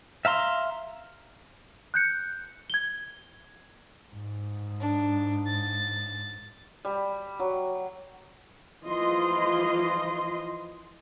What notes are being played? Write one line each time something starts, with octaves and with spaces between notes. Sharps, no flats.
E5 F5 A#5 C6
F#6 G6 C#7
G#6 G7
G#2
D4
A6
G3
F#3
E3 F3 F4 D#5 C6